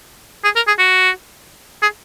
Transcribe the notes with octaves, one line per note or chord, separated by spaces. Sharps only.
G#4
A#4
G#4
F#4
G#4